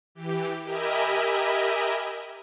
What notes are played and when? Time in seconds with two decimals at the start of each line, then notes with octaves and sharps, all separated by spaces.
0.15 E3 G4
0.64 G4 A#4 D#5 E5 G#5 B5